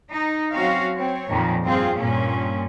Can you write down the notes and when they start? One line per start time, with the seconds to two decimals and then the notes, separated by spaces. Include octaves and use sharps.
0.10 D#4
0.53 F#3 C4 C#4 F#4 F5
0.96 C4 C#5
1.29 F2 A#2 D#3 F3
1.63 G2 C4 F4 G#4
1.99 G2 A#2 C#4